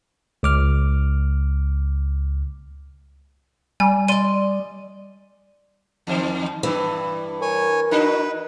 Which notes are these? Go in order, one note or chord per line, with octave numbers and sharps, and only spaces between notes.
C#2 D6 F6
G3 G#5
D5 D#5 C6 D#7
E2 D#3 C5
G2 E3
A#4 C#5 G#5
D4 D#4 F#4 B4